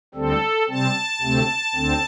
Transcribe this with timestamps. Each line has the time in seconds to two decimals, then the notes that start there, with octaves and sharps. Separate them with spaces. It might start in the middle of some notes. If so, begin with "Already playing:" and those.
0.15 D2 D3 G3 C4 A4
0.69 C3 G3 C4 A5
1.21 D2 C3 A3 C4
1.75 D2 D3 C4